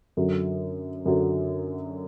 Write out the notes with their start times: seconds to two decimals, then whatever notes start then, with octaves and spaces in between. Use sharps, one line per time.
0.17 F#2 D3 F#3
1.06 F#2 D3 F#3